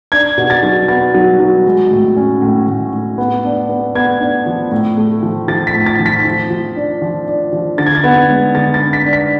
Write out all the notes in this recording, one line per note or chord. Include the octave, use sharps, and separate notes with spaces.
D4 G#6
B2
A6
F#3
B3 A6
F#3
F#3
G#3
A2
C#4
A2
A2
A2
B3
D4
B3
B3 G#6
D4
F3
A2
A3
F3
F3 A6
B6
A2
A6
F3
B6
F3
F3
D4
F3
D4
F3
D3 A6
G#6
A6
B3
G#3
D3 A6
A6
B3
B6
D4
B6